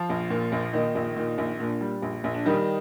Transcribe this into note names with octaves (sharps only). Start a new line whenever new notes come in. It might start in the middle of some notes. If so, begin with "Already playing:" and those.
Already playing: F3 F4
A#1
A#2
A#1
A#2 D#3 D#4
A#1
A#2
A#1
A#2 D4
G3
A#1
A#1
D4
D#3 G3 D#4